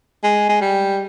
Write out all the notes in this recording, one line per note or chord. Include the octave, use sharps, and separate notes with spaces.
G#3
G#3
G3